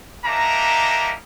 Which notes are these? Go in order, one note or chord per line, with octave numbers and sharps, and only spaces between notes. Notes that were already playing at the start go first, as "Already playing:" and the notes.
G3 A#3 D4 D#4 E5 A#5